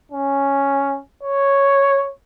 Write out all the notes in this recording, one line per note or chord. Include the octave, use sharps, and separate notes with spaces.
C#4
C#5